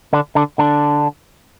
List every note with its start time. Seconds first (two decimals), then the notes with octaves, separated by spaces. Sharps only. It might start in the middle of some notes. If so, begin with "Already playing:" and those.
0.13 D3 D4
0.35 D3 D4
0.58 D3 D4